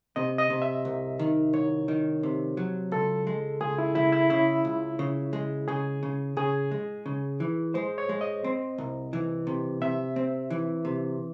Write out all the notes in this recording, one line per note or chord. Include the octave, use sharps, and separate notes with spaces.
C3 D#5
D#5
C3
E5
C2
D#3
C2 C#5
D#3
C3
F#3
C#2 A4
G#3
C#2 G#4
E4
C#2 E4
E4
C#3 E4
C#2
C#3
G#3
C#3 G#4
C#3
C#3 G#4
G#3
C#3
E3
G#3 C5
C#5
G#3
D#5
C4
C2
E3
C3
C3 E5
C4
E3
C3